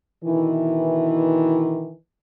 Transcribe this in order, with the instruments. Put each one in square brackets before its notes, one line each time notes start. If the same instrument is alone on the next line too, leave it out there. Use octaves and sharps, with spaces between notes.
[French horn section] B2 D#3 E3